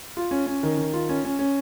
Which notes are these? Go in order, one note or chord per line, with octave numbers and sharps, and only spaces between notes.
F4
C#4
C#4
D#3
D#3
F4
C#4
C#4
C#4